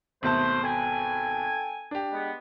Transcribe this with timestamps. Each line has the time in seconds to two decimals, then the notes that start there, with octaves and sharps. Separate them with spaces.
0.23 G#1 B2 A3 C5 A5
0.63 A4 G5 G#5
1.91 D4 G4
2.13 G#3 B3